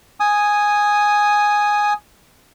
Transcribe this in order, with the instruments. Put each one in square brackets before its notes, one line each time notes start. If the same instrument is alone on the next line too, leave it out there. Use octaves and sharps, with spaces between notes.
[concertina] G#5 D#6